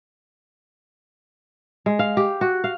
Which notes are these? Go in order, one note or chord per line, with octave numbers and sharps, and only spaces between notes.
G#3
F5
G4
F#4
F5